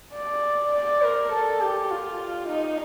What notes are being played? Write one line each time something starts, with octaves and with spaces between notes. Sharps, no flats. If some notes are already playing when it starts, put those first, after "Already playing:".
D5
D5
A#4
A4
G4
F4
D#4